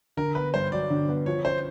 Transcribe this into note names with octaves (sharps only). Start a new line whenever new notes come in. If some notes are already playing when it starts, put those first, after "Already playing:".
D3 A#4
B3 B4
G2 C5
F#3 D5
D3
B3
F3 C#5
C#4 C5